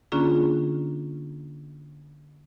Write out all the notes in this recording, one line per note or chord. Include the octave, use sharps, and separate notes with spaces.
D3 A#3 C#4 D4 F4 G#4